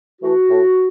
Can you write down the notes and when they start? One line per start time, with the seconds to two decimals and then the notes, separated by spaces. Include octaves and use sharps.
0.22 E3 A3 F#4
0.50 A2